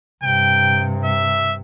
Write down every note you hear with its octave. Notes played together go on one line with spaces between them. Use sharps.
G2 C3 G5
E5